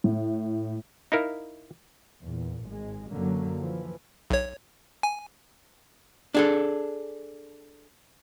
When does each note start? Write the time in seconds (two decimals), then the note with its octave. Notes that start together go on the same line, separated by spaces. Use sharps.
0.04 A2
1.12 D#4 E4 A#4 F5
2.23 E2 A#2
2.66 G#1 G#3
3.12 F#2 D3 F#3 A#3
3.61 E3 F3
4.30 B1 C#5
5.03 G#5
6.35 D4 G#4 A4